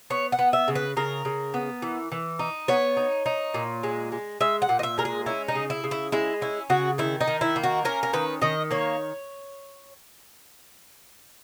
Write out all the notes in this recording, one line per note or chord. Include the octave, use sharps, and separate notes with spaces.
B3 C#5
F#5
B3
E5
C#3
B4
C#3 A#4
C#3
B3
E3
E3
D#4
B3 C#5
D#4
D#4
A#2
G#3
G#3
G#3 E5
F#5
A#2
D#5
E5
G#3 A#4
G#4
C#4 E4
D#4
C#3
E4
C#3
E4
G#3 E4
C#4 E4
C#3 F#4
D#3 E4
D#4
D#3
E4
A#3
F#4
C#4 A#4
A#4
D#3 B4
D#3 D#5
A#3 C#5